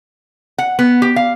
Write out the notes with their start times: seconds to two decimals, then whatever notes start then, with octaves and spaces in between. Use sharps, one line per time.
0.58 F#5
0.79 B3
1.02 G4
1.16 F5